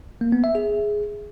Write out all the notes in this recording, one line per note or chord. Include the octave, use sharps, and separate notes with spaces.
A#3
B3
E5
G#4